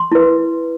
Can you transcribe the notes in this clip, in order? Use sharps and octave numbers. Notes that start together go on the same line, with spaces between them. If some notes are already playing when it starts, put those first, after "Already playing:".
Already playing: C6
E4 B4